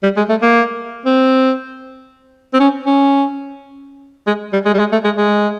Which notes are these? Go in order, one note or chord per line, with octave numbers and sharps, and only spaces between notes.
G3
G#3
A3
A#3
C4
C4
C#4
C#4
G#3
G3
G#3
G3
G#3
A3
G#3
G#3